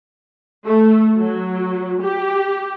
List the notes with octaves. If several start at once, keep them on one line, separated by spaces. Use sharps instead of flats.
A3
F#3
G4